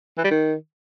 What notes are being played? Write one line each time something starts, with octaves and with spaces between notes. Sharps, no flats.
E3
G3
D#3